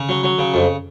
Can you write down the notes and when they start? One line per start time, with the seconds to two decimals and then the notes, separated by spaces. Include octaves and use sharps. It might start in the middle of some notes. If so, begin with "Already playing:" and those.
Already playing: C#3
0.09 F#3
0.23 F#3
0.38 C#3
0.54 F2